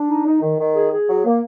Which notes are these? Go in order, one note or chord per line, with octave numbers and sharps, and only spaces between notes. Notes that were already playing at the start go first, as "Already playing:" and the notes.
Already playing: D4
D#4
D#4
D#3
D#3
G#4
G#4
F#3
A#3